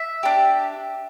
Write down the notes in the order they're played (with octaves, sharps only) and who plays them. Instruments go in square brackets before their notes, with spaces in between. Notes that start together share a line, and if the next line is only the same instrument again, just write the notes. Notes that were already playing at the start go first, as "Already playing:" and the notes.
Already playing: [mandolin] E5
D4 G4